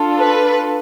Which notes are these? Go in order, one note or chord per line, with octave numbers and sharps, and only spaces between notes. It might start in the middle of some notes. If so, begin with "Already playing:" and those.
Already playing: D4 F4 A4
B4